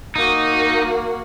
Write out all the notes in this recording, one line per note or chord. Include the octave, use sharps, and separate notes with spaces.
A#3 D#4 F#4